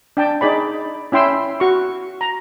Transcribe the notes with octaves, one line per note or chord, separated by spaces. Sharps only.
D4 G5 A5
D#4 G#4 D5 B5
C#4 E4 G5 C6 E6
F#4 C#6
A#5